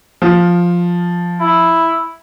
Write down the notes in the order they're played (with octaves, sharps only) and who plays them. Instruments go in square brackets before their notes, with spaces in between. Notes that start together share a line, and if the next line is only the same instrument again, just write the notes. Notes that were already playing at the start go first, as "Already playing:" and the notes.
[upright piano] F3
[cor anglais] E4